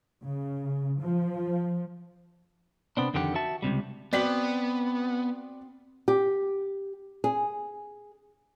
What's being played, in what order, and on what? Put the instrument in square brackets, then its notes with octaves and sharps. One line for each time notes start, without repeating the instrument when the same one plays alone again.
[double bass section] C#3
F3
[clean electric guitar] C3 B3 C4 D4
F2 D3 D#3 G4 A4 F#5
F#4 E5 A5
C#2 G#2 C3 G3
[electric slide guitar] B3 [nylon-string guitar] C4 F#4 G5 [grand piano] D5 B6 F#7
[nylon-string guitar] G4
G#4